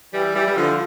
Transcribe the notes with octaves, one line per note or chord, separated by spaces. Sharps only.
E3 G3
E3 G3
G3
D3 F3